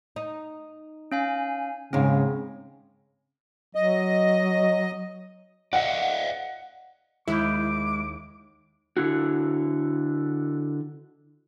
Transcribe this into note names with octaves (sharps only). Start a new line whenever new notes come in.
D#4
C#4 F5 G#5
D#2 G#2 C#3 C4
F#3 D#5
D5 D#5 F5 F#5
D#2 G#3 E4 D6 G6
D3 E4 F#4